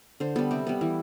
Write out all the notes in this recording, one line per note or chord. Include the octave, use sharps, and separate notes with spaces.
D3 C5
G3 B3 A4
C3 G4
G3 B3
E3 E4